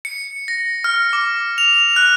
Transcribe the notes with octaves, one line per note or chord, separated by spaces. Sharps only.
C#7
A#6
F6
D6
F7
F#6